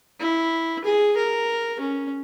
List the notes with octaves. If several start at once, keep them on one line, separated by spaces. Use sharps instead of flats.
E4
G#4
A#4
C#4